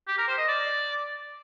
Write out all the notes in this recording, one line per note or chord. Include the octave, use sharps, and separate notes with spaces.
G4
A#4
C5
D#5
D5